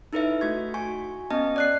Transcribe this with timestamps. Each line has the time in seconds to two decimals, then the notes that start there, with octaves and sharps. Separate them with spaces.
0.13 D#4 E4 A4 B4 C#5 E5
0.41 A3 F#4 C#6 G#6
0.74 F#4 G#5 C#6
1.30 B3 C#4 D#5 A5
1.56 D5 F#6 C7